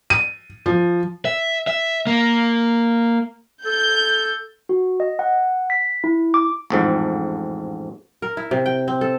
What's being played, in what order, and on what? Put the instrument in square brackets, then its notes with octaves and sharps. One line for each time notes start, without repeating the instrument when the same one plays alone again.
[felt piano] D#7
F3
[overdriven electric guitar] E5
E5
A#3
[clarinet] A4 [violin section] G6
[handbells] F#4
D#5
F#5
B6
E4
D6
[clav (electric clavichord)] A1 F2 G#2
[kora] A#4
E4
C3
G5
C4
A4